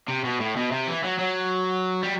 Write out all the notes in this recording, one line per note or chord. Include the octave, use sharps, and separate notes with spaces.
C3
B2
A2
B2
C3
E3
F#3
F#3
G3